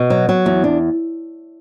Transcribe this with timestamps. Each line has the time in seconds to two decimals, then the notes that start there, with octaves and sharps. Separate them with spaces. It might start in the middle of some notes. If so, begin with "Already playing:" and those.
Already playing: B2
0.10 F#3
0.29 F#3
0.46 E2
0.64 D4